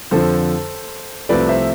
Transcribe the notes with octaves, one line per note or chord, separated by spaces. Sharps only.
F2 D3 F3 A4 C5
C2 C3 F3 A3 B4 D5
C5 E5